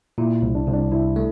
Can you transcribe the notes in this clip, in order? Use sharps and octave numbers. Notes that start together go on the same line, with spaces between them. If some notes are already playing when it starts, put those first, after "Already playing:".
A#2 E4
C2
D4
C2
D4
C2 E4
A3